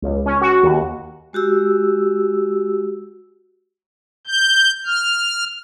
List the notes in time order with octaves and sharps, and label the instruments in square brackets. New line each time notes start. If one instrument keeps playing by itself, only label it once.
[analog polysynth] C#2
C#4
F#4
D#2
[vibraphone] G#3 F#4 G4 E6
[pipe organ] G6
F6